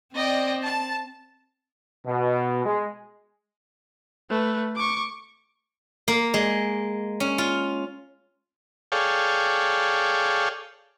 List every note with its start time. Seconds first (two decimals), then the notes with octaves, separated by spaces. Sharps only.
0.15 C4 D5 D#5 G5
0.62 A5
2.06 B2
2.65 G#3
4.30 A3 B4
4.75 C#6 D6
6.08 A#3
6.34 G#3
7.20 C#4
7.38 F4
8.92 G#4 A4 C#5 D5 F5 G5